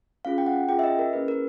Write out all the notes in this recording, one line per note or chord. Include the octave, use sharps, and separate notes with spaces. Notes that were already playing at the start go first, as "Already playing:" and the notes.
C#4 F4 G#4 F5
G5
F#5
C#4 F4 G#4 G5
E5
D#5
A#4
A#3 C#4 E4 G#4 B4
A#4